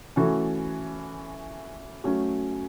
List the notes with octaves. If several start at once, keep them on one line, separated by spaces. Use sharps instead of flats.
E3 A3 C#4 F#4 A4
F#3 A3 C#4